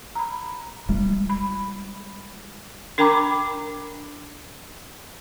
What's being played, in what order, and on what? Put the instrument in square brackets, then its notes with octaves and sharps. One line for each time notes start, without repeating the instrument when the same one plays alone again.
[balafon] A#5 B5
[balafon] G3 [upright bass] G#3 F4
[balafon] B5
D4 A#4 G5 A#5 B5 D6